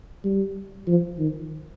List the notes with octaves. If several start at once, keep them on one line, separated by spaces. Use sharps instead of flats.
G3
F3
D#3